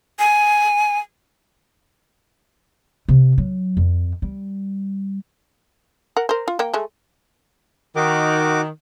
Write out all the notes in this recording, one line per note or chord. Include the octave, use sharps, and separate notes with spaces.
G#5
C3
F#3
F2
G3
A#4 F#5
A#4 C5
F4
A#3 G5
G#3 A3
D#3 D#4 F#4 D6